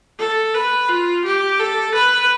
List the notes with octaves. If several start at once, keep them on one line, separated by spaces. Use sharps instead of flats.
A4
B4
F4
G4
A4
B4